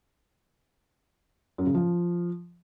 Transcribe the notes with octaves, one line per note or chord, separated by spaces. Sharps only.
F#2
C#3
F3